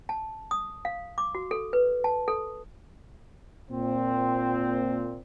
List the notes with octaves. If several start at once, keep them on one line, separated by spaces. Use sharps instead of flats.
A5
D#6
F5
D6
F#4
A4
B4
A5
A4
A#2 C4